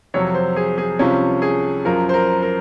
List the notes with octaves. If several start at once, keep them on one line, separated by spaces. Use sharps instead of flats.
F2 C3 F#3 C#5
C5
G#4
G#4
C2 C3 F3 C#4
G#4
F#2 F3 A#4
C5
A#4
A#4